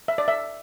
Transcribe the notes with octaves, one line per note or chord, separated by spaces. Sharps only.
E5
D5
E5